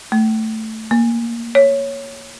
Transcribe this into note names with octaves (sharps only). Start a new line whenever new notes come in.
A3
A#3
C#5